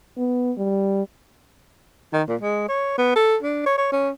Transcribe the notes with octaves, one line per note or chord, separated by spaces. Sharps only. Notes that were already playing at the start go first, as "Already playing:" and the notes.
B3
G3
D#3
A#2
G#3
C#5
B3
A4
D4
C#5
C#5
C#4